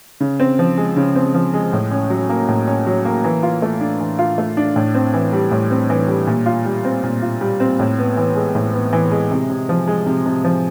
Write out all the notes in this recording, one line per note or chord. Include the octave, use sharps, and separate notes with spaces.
C#3
C4
F3
G#3
C#3
C4
F3
G#3
A2
C#4
F#3
A#3
A2
C#4
F#3
A#3
E3
F4
A3
D4
E3
F4
A3
D4
A2
C4
E3
G3
A2
C4
E3
G3
A#2
F4
G3
C4
A#2
F4
G3
C4
A2
B3
E3
G#3
A2
B3
E3
G#3
C3
C3
F3
G#3
C3
C3
F3